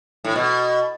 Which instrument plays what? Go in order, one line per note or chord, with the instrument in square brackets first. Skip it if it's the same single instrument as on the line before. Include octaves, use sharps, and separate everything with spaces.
[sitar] A2
B2